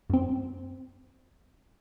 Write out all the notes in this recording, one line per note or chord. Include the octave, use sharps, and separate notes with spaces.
F#2 C4